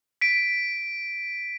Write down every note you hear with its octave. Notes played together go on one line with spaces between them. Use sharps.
B6 D7